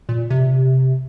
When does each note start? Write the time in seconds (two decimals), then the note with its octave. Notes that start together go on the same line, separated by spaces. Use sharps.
0.09 A#2
0.30 C3